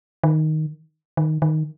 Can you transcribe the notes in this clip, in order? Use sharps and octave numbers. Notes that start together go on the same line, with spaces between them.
D#3
D#3
D#3